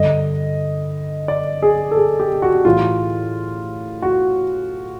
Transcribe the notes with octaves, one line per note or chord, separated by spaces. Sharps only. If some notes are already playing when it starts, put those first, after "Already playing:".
Already playing: G2 D3 D#5
D5
G#4
A4
G#4
G4
F#4
A2 E3 F4
F#4